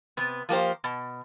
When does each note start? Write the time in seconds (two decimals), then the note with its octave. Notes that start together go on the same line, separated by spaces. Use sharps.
0.17 C3 B3
0.49 F3 A#3 G4 C5
0.84 B2